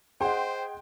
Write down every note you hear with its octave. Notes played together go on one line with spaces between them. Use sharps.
G#4 C5 D#5 F#5 G5 C6